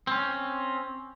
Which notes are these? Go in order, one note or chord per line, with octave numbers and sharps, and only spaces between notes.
C4 C#4